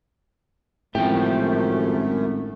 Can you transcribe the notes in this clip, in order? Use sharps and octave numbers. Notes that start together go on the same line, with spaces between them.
G#1 F#2 A2 F3 A3 G4